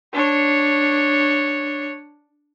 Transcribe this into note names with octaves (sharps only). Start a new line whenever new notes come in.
D4 C#5